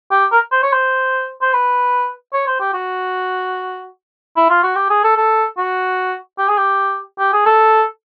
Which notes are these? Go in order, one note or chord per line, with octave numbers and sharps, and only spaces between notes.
G4
A#4
C5
C#5
C5
C5
B4
C#5
C5
G4
F#4
E4
F4
F#4
G4
G#4
A4
A4
F#4
G4
G#4
G4
G4
G#4
A4